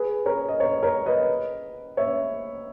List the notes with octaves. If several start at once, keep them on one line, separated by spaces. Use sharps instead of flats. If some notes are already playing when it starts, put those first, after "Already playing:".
Already playing: G#4 B4
A#4 C#5
D#5
A#4 C#5
A#4 C#5
B4 D#5
C#5 E5